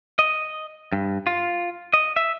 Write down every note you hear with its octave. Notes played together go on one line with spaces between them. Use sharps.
D#5
G2
F4
D#5
E5